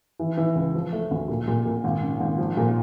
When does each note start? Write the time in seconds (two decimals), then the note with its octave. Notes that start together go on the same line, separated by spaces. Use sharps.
0.19 E3
0.37 E3
0.55 C#2
0.75 F3
0.93 A3
1.11 D2
1.28 A#2
1.48 A#2
1.65 A#2
1.84 G#1
2.03 C#3
2.21 G#1
2.38 F3
2.57 A#2